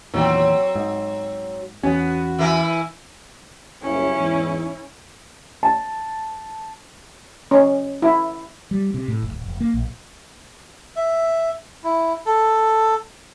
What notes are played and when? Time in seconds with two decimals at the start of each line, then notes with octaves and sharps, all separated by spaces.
0.14 E2 A#2 D#3 F#3 C4
0.75 G#2
1.83 E2 B3 C#4 F#4
2.39 E3 E4 A#4
3.82 F#1 C2 C#4 E4
4.16 E2 G#2
5.63 A5
7.51 C#4
8.02 E4
8.71 G3
8.94 C3
9.08 A2
9.22 F#1
9.34 D1
9.46 F1
9.60 A#3
9.74 A#1
10.96 E5
11.84 E4
12.26 A4